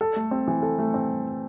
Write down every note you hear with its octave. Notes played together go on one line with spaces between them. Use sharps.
A4
A3
C4
E3
A4
A3
C4